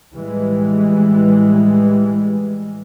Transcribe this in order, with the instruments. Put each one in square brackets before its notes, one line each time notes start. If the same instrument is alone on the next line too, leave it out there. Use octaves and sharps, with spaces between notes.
[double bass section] A2 E3 G3 G#3